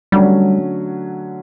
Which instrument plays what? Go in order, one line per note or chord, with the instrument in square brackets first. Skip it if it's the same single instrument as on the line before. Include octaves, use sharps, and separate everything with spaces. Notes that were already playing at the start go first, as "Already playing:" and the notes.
[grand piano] D3 F#3 A3 C#4 [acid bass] G3